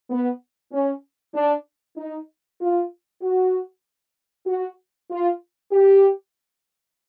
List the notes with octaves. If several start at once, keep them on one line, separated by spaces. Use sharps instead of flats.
B3
C#4
D4
D#4
F4
F#4
F#4
F4
G4